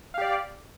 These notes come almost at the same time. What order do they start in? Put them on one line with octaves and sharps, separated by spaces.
F5 G4 D5